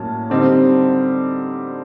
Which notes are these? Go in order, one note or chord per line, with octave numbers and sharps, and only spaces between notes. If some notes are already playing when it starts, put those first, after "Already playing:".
Already playing: A2 F#3 A#3 C#4 A5
D3 G3 C4 D#4